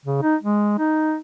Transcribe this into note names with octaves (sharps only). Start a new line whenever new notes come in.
C#3
D#4
G#3
D#4